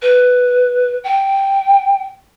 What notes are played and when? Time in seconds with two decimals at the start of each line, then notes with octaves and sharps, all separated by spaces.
0.02 B4
1.04 G5